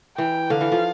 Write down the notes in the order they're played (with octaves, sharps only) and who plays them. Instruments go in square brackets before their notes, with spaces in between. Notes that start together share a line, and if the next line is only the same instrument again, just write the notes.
[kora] E3 [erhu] G5
[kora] D3 [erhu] F5
[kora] E3
F3